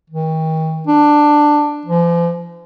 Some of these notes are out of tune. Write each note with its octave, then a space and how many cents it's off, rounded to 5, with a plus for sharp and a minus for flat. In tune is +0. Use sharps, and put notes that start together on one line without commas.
D#3 +40
D4 +10
F3 -40